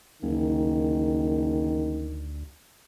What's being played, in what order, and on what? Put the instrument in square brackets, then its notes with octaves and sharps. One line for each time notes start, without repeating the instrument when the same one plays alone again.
[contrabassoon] F#1 [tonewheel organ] D2 [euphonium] D#3